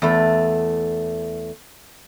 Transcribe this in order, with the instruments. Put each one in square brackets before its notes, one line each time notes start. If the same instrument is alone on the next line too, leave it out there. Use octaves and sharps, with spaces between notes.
[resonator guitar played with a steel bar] E2 A3